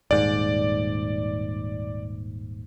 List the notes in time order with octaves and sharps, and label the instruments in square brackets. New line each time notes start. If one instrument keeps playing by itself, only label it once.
[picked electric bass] D#1 G#2 [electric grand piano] D5